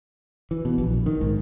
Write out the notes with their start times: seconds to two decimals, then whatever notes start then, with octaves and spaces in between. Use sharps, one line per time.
0.51 E3
0.65 B2
0.78 A#1
1.06 D#3
1.21 G#2